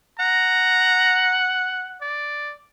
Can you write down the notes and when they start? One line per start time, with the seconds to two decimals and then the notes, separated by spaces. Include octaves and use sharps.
0.20 F#5 A#5
2.02 D5